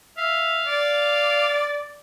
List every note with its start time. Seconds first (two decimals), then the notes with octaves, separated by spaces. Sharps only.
0.17 E5 F5
0.66 D5